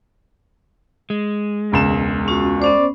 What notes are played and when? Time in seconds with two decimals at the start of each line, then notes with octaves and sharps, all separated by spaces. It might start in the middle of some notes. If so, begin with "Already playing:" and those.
1.10 G#3
1.72 E1 C#2 E7
2.28 C#4 F4 F#4
2.62 B3 C#4 C5 D5